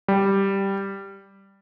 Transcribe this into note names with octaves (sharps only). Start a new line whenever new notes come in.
G3